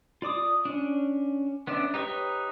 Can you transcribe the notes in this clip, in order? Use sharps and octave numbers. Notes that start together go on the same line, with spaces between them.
F4 D5 D6 D#6
C#4 D4
B3 C#4 D4 D5 E5
D#4 G4 B4 C#5 C#6